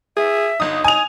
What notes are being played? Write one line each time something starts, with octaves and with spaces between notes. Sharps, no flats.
G#4 E5
G1 D#4 D#6
G#5 D#6 F7